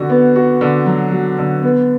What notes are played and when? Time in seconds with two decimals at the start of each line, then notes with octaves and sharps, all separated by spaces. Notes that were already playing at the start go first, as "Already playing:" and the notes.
Already playing: D3 F#4
0.10 B3
0.36 F#4
0.61 D3
0.86 F#3
1.12 F#3
1.38 D3
1.63 B3